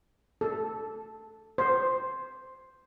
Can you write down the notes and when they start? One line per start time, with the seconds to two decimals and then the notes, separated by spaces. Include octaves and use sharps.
0.41 A4
1.58 C5